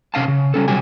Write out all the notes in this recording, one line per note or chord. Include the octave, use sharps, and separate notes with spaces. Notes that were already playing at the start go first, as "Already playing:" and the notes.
C3 C#4 F5 A5
C#3
G3 C#4 A4
C3 F#3 G3 G4 G#5